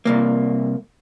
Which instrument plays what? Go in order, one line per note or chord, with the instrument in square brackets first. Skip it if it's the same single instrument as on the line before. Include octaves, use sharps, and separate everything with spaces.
[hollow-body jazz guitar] C2 G2 A#3